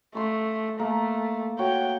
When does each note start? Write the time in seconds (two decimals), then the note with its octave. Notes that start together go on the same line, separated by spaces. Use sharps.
0.15 A3 F5 C6 C#6
0.79 A3 A#3
1.59 F#4 C#5 G5